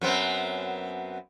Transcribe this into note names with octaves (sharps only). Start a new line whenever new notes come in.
F#2 B3 C4